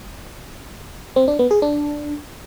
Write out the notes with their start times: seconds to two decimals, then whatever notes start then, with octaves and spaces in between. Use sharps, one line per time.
1.16 C4
1.28 D4
1.39 B3
1.51 G#4
1.62 D4